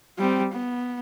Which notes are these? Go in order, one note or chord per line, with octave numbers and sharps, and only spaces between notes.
G3 C4
B3